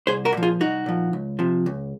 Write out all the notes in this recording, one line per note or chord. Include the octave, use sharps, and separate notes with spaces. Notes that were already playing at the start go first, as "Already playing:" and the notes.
C2 G#4 C5
F#4 A#4
A#2 F3
F4 G#4
C2 D#4 F#4
A#2 F3
C#2
C3 F3
C#2